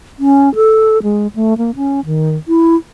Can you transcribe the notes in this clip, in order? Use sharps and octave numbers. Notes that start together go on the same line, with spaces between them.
C#4
A4
G#3
A3
A#3
C#4
D#3
E4